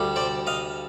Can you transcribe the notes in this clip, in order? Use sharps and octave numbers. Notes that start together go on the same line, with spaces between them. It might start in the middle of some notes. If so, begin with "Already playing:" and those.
Already playing: D2 D3 G3
C5 D5
D#5 F5